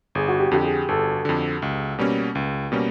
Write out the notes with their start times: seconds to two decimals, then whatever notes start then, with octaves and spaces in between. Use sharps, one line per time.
0.15 G1 G#4
0.28 F#4
0.40 G4
0.51 F2 D3 G4
0.64 G#4
0.88 G1 A4
1.25 F2 D3
1.62 C#2
1.99 B2 G3 A#3 C#4
2.35 C#2
2.72 B2 G3 A#3 C#4